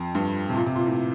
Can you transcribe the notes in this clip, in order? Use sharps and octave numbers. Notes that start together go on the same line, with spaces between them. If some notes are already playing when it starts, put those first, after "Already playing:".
Already playing: F2
G2
C3
A#2
C3
A#2
A2